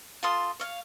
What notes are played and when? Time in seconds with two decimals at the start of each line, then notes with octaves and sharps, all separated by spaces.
0.23 F4 A4 C6 D#6
0.60 C#5 F5